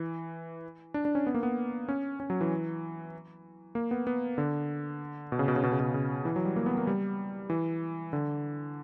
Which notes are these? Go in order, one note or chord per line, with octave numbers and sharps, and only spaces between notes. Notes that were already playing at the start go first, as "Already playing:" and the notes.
Already playing: E3
D4
D4
C#4
B3
A#3
B3
C#4
C#4
F#3
E3
A#3
B3
B3
D3
B2
C#3
B2
C#3
B2
C#3
B2
C#3
E3
F#3
G3
A#3
B3
A#3
G3
E3
D3